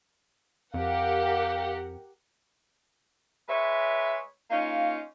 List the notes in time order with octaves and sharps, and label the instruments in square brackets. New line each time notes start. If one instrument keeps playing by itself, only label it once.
[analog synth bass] F2 [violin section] G4 A#4 F#5 [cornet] F5
[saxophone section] G#3 B4 C#5 E5
A#3 C#4 D#4 F4